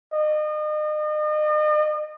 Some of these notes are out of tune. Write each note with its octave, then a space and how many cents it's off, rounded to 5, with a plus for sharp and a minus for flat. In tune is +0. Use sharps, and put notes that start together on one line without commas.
D#5 -40